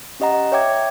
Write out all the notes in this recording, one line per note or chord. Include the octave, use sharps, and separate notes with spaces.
C#4 G4 D#5 F#5 A#5
C#5 E5 G5 D6 G#6